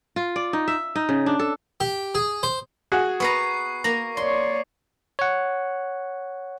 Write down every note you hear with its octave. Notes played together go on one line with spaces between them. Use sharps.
F4
D5
D#4
E5
D#4
C#3
D4
A4
G4
G#4
C5
F#4 G#4
B3 B4 A#5 C#6 C7
A#3 A#5
C#5 D5 C6
C#5 F#5